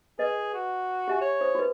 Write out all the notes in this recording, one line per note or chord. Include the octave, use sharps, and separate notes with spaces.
G#4 B4 D#5
F#4
G4 E5 G#5
C#5
C5 D#6
F#4 B4